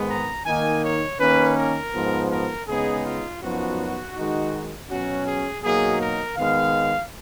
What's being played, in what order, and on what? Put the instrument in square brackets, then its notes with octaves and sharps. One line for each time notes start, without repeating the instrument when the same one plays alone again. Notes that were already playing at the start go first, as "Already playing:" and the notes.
Already playing: [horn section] G#2 D#3 G#3 B3
A#5
D#3 A#3 D#4 G#5
C#5
D#3 A#3 C#4 B4
A#4
G#2 F3 B3
A#4
C#3 G#3 B3 D#4 G#4
F4
F#2 F3 B3 D#4 F#4
D#3 G#3 D#4
B2 F#3 C#4 F#4
G#4
B2 F#3 A#3 D#4 G#4
A#4
D#3 G#3 B3 F5